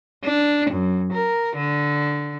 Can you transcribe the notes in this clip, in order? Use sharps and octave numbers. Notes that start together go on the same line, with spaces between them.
D4
F#2
A#4
D3